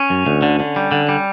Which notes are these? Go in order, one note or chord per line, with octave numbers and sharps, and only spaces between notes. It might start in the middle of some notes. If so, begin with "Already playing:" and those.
Already playing: C#4
F#2
D2
D3
D3
G3
D3
G3